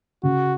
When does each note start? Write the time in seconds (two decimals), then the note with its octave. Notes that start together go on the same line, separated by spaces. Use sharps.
0.23 C#3 F#4